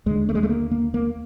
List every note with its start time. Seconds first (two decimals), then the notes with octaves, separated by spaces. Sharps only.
0.06 D#2 D3 G#3
0.29 A3
0.35 G#3
0.43 A3
0.49 A#3
0.71 A#3
0.94 A#3